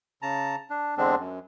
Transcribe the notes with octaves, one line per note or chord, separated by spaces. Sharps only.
C#3 A5 A#5
D4
E2 D3 G#3 C4 D4
F#2